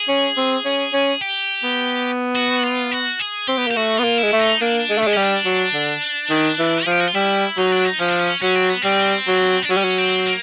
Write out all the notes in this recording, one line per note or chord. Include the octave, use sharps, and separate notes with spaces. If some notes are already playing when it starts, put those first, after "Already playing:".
Already playing: G#4
C#4
C4
C#4
C#4
G4
B3
F#4
F4
F#4
G#4
C4 G4
B3
A#3 G4
A3 F#4
B3 F4
A#3
E4
G#3
A3
D#4
A#3 D4
G#3
A3
D4
G#3
G3 C#4
D4
F#3
D3
D#3
E3
F3 G#4
G4
F#4
F4
G3 E4
F#3 D#4
D4
D#4
F3 C#4
D4
C#4
F#3 C#4
C4
B3
G3 C4
F#3
D4
F#3 C#4
G3
F#3
C4
A#3